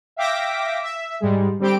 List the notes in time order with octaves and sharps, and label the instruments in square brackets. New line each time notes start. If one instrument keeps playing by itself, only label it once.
[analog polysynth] E5 F5 G5 D6 A#6 B6
E5
G#2 G3 G#3
D3 G3 C4 G4 D7